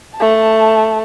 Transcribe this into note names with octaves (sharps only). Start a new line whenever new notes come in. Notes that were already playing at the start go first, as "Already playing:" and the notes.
A3 A5